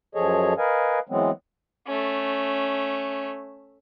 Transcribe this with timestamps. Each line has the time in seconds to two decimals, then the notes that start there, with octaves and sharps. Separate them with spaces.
0.15 F#2 F3 G#4 A4 C#5 D#5
0.58 A#4 B4 D#5 F5 G#5
1.09 E3 F#3 G#3 B3 C4
1.87 A3 C#4